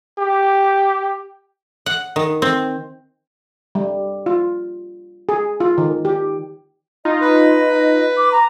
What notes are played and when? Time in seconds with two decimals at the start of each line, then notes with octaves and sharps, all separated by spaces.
0.19 G4
1.86 F#5
2.16 D#3
2.42 C4
3.75 G3
4.26 F4
5.29 G#4
5.60 F4
5.78 D#3
6.05 G4
7.05 D#4 F4 D#5
7.21 B4
8.17 D6
8.32 A#5